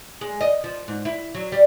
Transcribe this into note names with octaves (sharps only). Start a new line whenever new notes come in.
G#3
D#5
F3
G#2
E4
F#3
G3